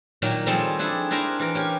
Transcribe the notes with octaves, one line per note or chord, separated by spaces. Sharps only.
A#2 D#3 F#3 A#3
D#3 F3 G3 C4 G#4 A4
D4 E4 G#4 A4
D4 E4 A#4 C5 G#5 A#5
E3 A#4
C#4 G4 G#5